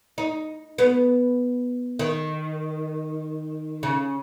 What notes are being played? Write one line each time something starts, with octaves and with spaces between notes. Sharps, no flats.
D#4
B3
D#3
C#3